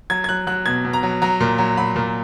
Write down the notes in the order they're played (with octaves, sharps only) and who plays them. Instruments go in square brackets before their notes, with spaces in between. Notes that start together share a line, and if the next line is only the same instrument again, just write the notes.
[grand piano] F#3 G#6
G#6
F#3 F#6
F#3 F#6
B2 G#6
B2
A#5
F#3
F#3 A#5
A#2
F#3
F#3 B5
A#2